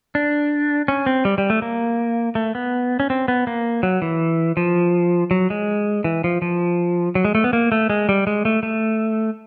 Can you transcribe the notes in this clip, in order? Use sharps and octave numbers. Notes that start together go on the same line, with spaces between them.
D4
C#4
C4
G3
G3
A3
A#3
A3
B3
C#4
C4
B3
A#3
F#3
E3
F3
F#3
G#3
E3
F3
F3
F#3
G#3
A3
B3
A#3
A3
G#3
G3
G#3
A3
A3